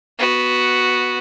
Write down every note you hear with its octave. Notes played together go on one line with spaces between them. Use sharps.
B3 F#4